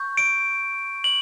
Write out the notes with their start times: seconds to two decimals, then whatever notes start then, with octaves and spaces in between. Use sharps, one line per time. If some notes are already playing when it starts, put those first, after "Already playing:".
Already playing: C#6 G6
0.17 D7
1.04 F#7